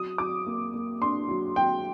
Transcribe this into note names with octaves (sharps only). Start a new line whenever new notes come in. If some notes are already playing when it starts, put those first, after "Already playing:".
Already playing: F#3 D#6
F#3 D6
A#3
A#3
D4 C6
F#3
F#3 G5